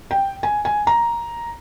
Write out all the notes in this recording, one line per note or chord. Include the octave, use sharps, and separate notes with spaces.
G5
G#5
G#5
A#5